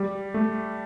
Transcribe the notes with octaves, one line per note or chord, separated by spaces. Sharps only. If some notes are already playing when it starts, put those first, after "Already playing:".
Already playing: G3
A3